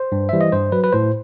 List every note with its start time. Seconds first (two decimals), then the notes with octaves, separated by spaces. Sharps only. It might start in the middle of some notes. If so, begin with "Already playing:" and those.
Already playing: C5
0.12 G2
0.29 E3 G3 E5
0.41 D#5
0.53 G2 C5
0.72 F#3 B4
0.84 B4
0.93 A2 C5